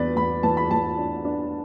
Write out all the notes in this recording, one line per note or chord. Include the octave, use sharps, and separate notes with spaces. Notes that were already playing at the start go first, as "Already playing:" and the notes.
Already playing: E2 D4 B4 D5
E2 B5
E3 A5
B5
E3 A5
D4
D4